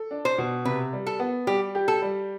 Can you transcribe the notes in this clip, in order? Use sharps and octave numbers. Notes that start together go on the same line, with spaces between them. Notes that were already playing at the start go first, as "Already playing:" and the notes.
Already playing: A4
D4
C5
B2
C3 B4
G3
A4
B3
G3 G4
G4
A4
G3